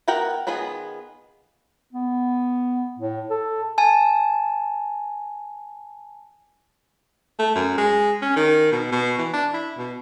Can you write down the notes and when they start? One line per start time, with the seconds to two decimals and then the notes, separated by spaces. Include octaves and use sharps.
0.08 B3 F#4 A#4 F#5 G5
0.47 D#3 B3 F4 G#4 G#5
1.93 B3
2.98 A2
3.30 A4
3.78 G#5 A5
7.39 A3
7.55 F#2
7.78 G#3
8.22 C#4
8.36 D#3
8.72 B2
8.92 B2
9.18 E3
9.33 D4
9.54 E4
9.78 B2